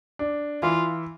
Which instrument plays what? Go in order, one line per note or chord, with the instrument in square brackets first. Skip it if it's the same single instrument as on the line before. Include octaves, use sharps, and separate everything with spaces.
[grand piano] D4
[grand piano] E3 [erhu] F4